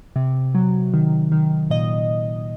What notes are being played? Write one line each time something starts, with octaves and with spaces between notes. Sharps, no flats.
C3
F#3
D#3
D#3
A#2 D#5